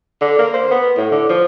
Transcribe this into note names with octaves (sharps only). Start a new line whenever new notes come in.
D3
A#3
C5
B3
A2
D3
F3